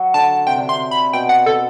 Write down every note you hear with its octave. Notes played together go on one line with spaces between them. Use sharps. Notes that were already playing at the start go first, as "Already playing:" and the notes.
Already playing: F#3
D3 A5
C3 G5
D3
C3 C6
B5
B2 G5
F#5
A4